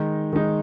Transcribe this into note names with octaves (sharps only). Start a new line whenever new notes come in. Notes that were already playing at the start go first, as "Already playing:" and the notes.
Already playing: D#3 G#3 D#4
D#3 G#3 D#4